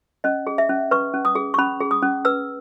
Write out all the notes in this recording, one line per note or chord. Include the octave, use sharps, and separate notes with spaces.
C#4 D#5
G#4
E5
C#4
B4 C#6
C#4
D#6
G#4
C#6
C#4 B5
G#4
D#6
C#4
B4 E6